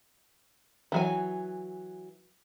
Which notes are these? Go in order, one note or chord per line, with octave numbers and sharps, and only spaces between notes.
E3 F#3 G#5